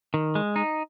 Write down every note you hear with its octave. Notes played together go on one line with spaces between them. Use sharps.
D#3
G#3
D#4